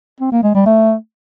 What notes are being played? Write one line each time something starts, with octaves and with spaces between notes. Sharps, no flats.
C4
A#3
G#3
G3
A3